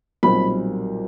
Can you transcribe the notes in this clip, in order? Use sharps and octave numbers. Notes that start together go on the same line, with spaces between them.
B1 A#2 G3 C4 B5